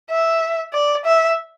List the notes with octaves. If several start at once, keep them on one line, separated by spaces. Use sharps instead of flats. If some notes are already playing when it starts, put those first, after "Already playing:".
E5
D5
E5